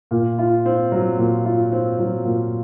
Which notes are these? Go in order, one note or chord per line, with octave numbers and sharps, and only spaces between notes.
A#2
F4
C4
F#3
A#2
F4
C4
F#3
A#2